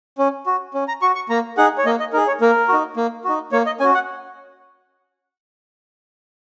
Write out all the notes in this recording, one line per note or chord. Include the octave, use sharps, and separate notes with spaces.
C#4
F#4
C#4
A#5
F#4 C#6
C#6
A#3 A#5
D#4 G#4 F#5
C#5
A#3 D#5
D#5
D#4 G#4 A#4
C#5
A#3 A#4
D#4 F#4
A#3
D#4 F#4
A#3 C#5
D#5
C#4 F#4 G#5
F#5